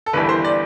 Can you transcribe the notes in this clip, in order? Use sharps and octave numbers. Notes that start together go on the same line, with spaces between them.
A4
G1 G2 E3 B4
C5
D5